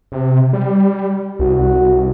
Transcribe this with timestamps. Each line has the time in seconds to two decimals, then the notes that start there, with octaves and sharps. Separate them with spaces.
0.12 C3
0.53 G3
1.39 C2 F#4